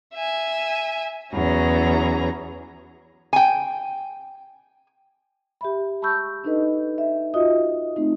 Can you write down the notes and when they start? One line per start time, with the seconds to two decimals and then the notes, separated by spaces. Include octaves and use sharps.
0.14 E5 G#5
1.33 E2 F#3 C#4 A#5
3.33 G5 G#5
5.61 G4 E5 B5
6.02 A5 B5 C#6 E6 G6
6.44 D4 D#4 A4 B4 D#5
6.98 E5
7.34 F4 F#4 D#5 E5 D#6
7.96 A3 C4 D#4